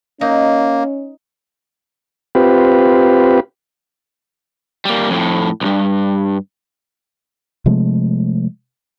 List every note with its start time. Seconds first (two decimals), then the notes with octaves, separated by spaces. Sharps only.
0.21 A#3 C#4 D#4
2.35 C4 F4 G4 B4
4.85 G3 A#3
5.10 F2 A2
5.61 B1 G2
7.66 C3 F3 G#3 A3